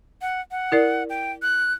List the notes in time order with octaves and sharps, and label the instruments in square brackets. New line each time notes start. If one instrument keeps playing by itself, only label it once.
[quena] F#5
F#5
[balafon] E4 A#4 D5
[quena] G5
F#6